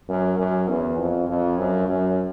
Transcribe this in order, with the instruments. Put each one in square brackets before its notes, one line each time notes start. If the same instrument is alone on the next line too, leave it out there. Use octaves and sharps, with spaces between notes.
[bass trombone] F#2
F#2
E2
F2
F2
F#2
F#2